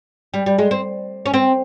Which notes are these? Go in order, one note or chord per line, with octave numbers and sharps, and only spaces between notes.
G3
G3
G#3
C4
C#4
C4